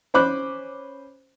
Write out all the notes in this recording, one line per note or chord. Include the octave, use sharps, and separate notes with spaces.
C#4 C5 B5 D6 F#6